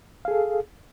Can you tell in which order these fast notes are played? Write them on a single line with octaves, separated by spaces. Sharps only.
F5 G#4 A4